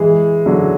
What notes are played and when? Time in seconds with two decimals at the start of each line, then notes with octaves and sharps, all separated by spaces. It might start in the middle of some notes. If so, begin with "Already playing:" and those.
Already playing: E3 G#3
0.46 D3 F#3